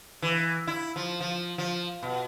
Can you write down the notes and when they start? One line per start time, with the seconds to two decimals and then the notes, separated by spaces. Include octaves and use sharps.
0.22 E3
0.67 E4
0.96 F3
1.21 F3
1.58 F3
2.03 B2